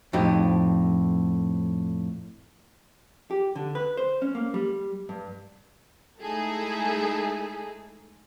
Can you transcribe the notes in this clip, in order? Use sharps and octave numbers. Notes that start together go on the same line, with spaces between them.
F2 A2 D#4 G4
G4
D3
B4
C5
C#4
A#3
G3
G2
G#3 A3 D#4 E4 G#4 A4